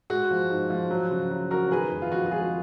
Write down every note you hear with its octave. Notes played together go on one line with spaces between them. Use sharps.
G#3 F#4
F3
G#2
F3
F#3
C#3
F#3
C#4 F#4 A#4
D#3 G#4 B4
F1
F4
F2 F#4
F#4
G#3 F4 G#4